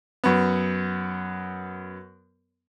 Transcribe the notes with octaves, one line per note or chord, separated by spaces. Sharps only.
F#2 B3